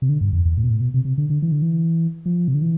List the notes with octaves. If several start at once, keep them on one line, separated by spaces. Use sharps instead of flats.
C3
D3
G2
F2
E2
A2
B2
A2
B2
C3
C3
D3
D3
E3
D3
E3
F3
C3
D3
E3